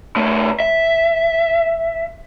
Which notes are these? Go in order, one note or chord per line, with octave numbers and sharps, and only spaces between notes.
C#3 A3
E5